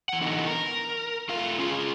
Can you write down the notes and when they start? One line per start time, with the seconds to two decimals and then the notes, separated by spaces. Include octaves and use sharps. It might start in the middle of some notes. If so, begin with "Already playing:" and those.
0.09 E3 F#5
0.21 D3 E3 B3 D#4
0.47 A#4
1.29 A3 F4 F5
1.59 C#4 F4 G#4